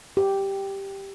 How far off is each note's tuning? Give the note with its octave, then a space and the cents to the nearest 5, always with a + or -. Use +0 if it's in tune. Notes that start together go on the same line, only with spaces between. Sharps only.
G4 +0